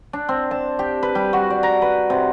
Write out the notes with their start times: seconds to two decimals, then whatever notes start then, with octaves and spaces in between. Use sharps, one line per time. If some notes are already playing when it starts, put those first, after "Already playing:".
0.13 D4
0.29 C4
0.51 A5
0.79 G4
1.03 B4
1.15 G3
1.33 F#4
1.50 D5
1.63 A#5
1.82 B4
2.10 C3